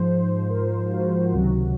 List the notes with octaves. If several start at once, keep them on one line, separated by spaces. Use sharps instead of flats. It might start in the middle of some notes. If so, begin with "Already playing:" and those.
Already playing: G#2 F3 C5
A#4
F4
F#4
C#2 C3 D#3 F#3 F#4